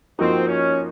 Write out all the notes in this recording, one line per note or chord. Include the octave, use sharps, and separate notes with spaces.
F3 A#3 C4 D#4 F#4
C#4